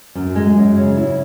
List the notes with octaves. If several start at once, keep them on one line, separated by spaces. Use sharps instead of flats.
F#2
G#3
F#2
C#3
E4